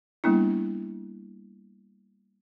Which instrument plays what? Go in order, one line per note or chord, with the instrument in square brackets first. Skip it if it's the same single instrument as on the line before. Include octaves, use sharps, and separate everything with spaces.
[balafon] G3 A#3 B3 D4 E4